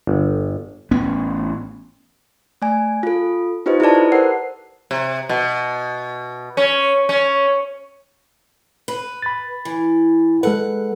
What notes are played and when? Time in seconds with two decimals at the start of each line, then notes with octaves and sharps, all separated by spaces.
0.07 G1
0.91 A1 B3 C#4
2.62 A3 D5 G#5
3.03 F4 A4
3.66 D#4 F4 G4 B4 C5 D#5
3.80 E4 G4 A4 B4 D5 A5
3.95 B4
4.12 A#4 C5 F#5 C7
4.91 C3
5.29 B2
6.57 C#4
7.09 C#4
8.88 B4
9.22 B5 A6
9.65 E3
10.43 G#3 A4 B4 F#5